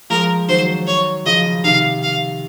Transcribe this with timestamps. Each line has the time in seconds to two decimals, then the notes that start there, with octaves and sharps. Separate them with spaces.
0.10 F3 G#3 A#4
0.48 D#3 F#3 C5
0.87 C#5
1.25 C#3 F3 D#5
1.64 C3 D#3 F5
2.03 F5